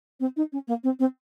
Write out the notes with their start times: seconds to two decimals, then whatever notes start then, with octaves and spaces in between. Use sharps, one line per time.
0.20 C4
0.37 D#4
0.52 C#4
0.68 A#3
0.84 C4
0.99 C4